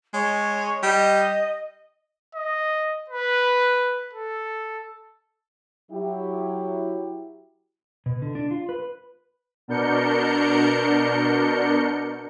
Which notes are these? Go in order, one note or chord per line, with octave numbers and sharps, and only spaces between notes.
G#3 C#5
G3 D#5
D#5
B4
A4
F#3 E4 G4
B2
D3
D4
F4
B4
B2 D4 A#4 G6 C#7